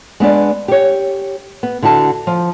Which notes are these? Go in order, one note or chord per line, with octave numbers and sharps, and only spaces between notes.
G#3 B3 D4 D5
G4 C#5
B3
D3 E4 F#4 A5
F3